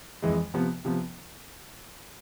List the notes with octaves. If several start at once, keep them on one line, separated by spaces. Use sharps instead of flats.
F2 E3 G#3
C3 F3 B3
C3 F3 B3